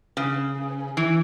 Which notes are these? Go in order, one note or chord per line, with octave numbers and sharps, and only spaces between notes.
C#3
E3